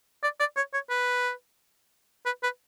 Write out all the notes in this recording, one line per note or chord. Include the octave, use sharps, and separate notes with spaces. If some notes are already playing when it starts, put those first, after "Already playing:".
D5
D5
C#5
C#5
B4
B4
B4